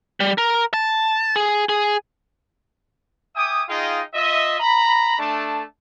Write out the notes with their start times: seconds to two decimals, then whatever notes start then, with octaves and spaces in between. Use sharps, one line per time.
0.20 G3
0.38 A#4
0.74 A5
1.36 G#4
1.69 G#4
3.36 E5 G5 G#5 D6 D#6
3.69 D#4 F4 G#4 D#5 F5 G5
4.14 F4 D#5 E5
4.60 A#5 B5
5.19 A3 D4 A5